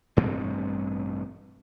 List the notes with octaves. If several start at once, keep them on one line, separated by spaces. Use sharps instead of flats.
A1 G2 B2 C4